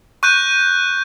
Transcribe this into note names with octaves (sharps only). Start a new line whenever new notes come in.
C#6 F#6 G6 D#7